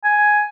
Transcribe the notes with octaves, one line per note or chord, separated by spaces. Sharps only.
G#5